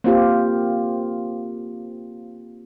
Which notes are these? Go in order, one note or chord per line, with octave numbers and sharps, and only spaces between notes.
A#3 C4 F4 G4